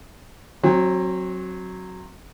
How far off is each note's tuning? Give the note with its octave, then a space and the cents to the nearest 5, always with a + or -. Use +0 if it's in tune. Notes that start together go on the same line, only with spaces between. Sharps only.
F#3 +0 C4 +30